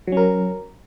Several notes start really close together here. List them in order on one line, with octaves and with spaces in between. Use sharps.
F#3 C#4 A#4